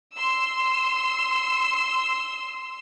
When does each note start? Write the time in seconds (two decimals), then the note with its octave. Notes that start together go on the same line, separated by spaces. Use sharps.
0.16 C6 E6